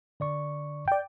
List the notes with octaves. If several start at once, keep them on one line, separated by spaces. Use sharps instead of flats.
D3 D5 C#6
D5 G5